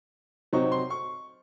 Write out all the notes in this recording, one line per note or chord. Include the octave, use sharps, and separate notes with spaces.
C3 F#3 C4 D#4 C#6
C6
C#6